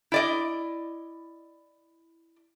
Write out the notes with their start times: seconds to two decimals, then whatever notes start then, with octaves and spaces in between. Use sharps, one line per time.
0.12 E4 D5 D#5